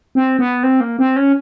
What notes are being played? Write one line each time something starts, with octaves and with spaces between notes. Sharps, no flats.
C4
B3
C4
A#3
C4
C#4